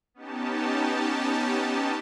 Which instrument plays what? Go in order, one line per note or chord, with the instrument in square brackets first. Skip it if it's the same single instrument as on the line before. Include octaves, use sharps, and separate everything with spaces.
[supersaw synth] B3 C#4 D#4 G4 A5